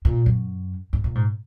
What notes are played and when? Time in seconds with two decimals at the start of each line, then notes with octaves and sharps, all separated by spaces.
0.05 A#2
0.26 F#2
0.93 G#2
1.04 A#2
1.15 G#2